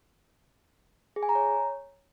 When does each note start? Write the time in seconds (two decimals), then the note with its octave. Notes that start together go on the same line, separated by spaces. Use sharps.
1.16 G#4
1.23 G#5
1.29 A#5
1.35 C#5